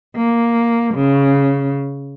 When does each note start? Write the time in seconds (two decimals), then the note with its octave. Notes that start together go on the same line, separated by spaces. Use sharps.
0.15 A#3
0.94 C#3